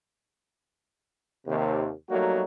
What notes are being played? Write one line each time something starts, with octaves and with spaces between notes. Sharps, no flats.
D#2 C3
F#3 G3 A3 A#3 D#4 F#4